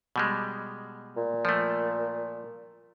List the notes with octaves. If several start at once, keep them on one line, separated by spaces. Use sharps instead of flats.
B2 G3 G#3
A#2
F3 A3